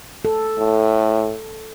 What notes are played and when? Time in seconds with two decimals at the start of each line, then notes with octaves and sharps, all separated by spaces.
0.25 A4
0.59 A2